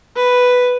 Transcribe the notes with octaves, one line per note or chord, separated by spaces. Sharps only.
B4